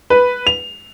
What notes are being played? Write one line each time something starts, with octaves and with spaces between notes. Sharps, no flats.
B4
F7